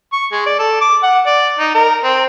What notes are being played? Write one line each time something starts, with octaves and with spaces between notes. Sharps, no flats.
C#6
G#3
D5
A4
D6
F#5
D5
D#4
A#4
C4